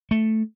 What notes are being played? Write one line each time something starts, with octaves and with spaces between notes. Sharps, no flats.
A3